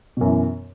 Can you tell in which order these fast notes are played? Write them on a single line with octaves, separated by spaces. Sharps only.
B2 F#2 E3